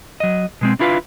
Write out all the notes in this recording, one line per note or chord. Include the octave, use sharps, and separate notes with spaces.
F#3 D#5
B2 G#3 C4
D4 E4 F4 B4 F5